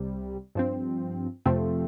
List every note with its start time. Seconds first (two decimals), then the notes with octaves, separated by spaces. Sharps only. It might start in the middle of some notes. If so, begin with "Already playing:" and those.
Already playing: C2 C3 G3
0.55 G2 F3 C4
1.46 F2 C3 F3 A3 C4